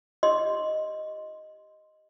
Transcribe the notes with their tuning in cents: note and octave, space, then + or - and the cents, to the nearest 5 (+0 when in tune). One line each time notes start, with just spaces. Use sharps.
G4 +0 D#5 +0 C6 +0